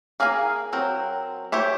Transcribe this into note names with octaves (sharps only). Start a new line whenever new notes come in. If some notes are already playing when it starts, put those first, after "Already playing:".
A#3 G#4 A#4 F5 G#5
F#3 C4 A#4
G4 C5 C#5 E5